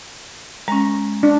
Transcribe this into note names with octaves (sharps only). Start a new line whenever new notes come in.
G#3 C#4 A#5
D4